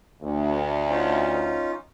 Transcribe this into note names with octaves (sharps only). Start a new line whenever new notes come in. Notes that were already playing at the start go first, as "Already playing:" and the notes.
D2
C#4 D#4 F4